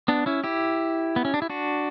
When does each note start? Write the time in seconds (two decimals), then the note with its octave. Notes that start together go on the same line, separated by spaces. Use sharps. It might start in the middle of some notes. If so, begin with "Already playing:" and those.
0.08 B3 D4
0.26 C#4 E4
0.44 E4 G4
1.16 B3
1.25 C#4
1.34 D4
1.42 E4
1.50 D4 F#4